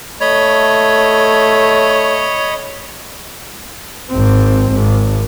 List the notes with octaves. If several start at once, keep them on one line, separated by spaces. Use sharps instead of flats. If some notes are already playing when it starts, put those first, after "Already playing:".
A3 C#5 D#5 B5
G#1 C4
G#1